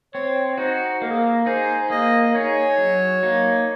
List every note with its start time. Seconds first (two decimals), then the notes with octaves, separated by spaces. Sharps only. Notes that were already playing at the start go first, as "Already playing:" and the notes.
0.14 C4 C#5
0.57 D#4 F#4 C5
1.02 A#3 A#4
1.11 G#4
1.18 A#4
1.46 D#4 G#4 C5
1.90 A#3 D#5
2.35 D#4 G#4 C#5
2.78 F#3
3.23 A#3 D#4